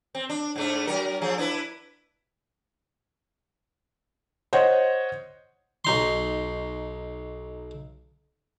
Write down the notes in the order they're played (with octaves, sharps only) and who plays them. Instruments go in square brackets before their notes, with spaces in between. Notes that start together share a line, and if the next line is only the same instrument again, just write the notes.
[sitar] C4
D4
G#2 A3 D4
F#3 A#4
F3 A3 G#4
D4 E4 B4
[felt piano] C5 C#5 D#5 F#5
[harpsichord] B1 D#4 C6